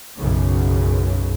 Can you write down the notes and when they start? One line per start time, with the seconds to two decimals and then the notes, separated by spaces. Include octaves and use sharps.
0.16 B1 F#2 C#3